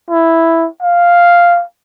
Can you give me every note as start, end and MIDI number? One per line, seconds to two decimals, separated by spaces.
0.10 0.68 64
0.83 1.63 77